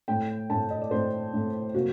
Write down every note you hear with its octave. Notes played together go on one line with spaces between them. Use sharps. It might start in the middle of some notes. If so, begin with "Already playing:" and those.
A2 A3 C4 G5
A2 A3 C4 A5
D#5
D5
A2 A3 C4 C5
A2 A3 C4
C3 F#3 A#3 F#4